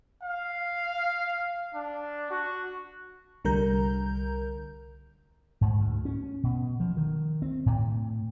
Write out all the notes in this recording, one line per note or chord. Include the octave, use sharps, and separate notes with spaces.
F5
D4
F#4
C2 D3 G3 A#4 A#5 G6
G#2
D2
C#4
B2
F3
D#3
C4
A2